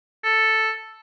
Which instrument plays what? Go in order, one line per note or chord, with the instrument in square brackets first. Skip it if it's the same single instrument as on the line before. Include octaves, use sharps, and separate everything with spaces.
[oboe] A4